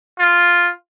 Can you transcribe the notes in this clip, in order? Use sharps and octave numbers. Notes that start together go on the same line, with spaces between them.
F4